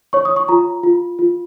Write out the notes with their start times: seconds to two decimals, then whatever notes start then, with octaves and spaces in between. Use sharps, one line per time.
0.13 C#5 C#6
0.25 D#6
0.36 C#6
0.48 F4 A#5
0.83 F4
1.19 F4